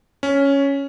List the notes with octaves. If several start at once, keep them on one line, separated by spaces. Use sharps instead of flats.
C#4